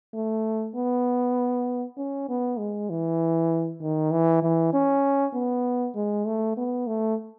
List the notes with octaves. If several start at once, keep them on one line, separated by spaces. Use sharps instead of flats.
A3
B3
C#4
B3
G#3
E3
D#3
E3
E3
C#4
B3
G#3
A3
B3
A3